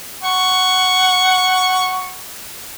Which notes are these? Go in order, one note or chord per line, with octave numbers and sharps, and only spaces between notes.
F#5 C#6